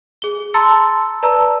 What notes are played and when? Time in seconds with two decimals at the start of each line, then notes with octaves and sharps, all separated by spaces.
0.22 G#4 G7
0.54 A5 A#5 C6 E6 A6 C#7
1.23 B4 D5 A5 A#5 E6